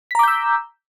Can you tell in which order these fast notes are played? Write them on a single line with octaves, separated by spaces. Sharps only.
B6 A#5 D6 G6 E6